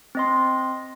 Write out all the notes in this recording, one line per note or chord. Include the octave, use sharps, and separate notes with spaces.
C4 D#5 C6